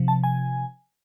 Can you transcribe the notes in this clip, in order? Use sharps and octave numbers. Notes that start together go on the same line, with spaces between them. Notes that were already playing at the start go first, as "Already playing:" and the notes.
Already playing: C3 F3
A5
G#5